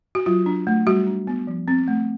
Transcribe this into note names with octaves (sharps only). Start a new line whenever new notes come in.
F#4
F#3 F4
D4
A3
G3 F#4
D4
B3
F3
C4
A3